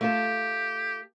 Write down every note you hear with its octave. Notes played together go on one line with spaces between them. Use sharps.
A3 F4 G4 A4